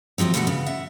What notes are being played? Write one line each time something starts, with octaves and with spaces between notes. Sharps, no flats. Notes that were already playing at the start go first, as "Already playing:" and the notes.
D#2 C3 F3 F#3 C4
B2 D3 A3 D#4 F4 F#4
C#3 B3
E5 F#5